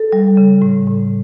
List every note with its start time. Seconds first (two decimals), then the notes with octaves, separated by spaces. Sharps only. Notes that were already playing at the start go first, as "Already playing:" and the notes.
Already playing: A4
0.13 G3
0.37 C#3
0.62 A2
0.87 A2